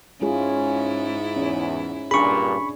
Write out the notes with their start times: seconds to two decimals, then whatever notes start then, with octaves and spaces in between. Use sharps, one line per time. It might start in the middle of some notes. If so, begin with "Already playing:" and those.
0.22 G#2 G#3 C#4 E4 F4 G#4
1.36 E2 C#4
2.11 G2 A#2 D4 G#4 B5 C#6